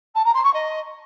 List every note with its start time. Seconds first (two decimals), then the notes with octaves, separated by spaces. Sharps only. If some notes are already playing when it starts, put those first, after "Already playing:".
0.15 A5
0.24 A#5
0.34 C6
0.43 C#6
0.53 D#5